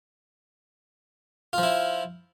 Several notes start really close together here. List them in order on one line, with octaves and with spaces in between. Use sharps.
F4 F3 E4